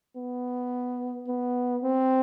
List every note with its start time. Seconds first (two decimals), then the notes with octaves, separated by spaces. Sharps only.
0.17 B3
1.28 B3
1.84 C4